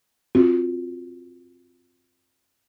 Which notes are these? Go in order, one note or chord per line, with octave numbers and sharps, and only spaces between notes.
C4 F4 F#4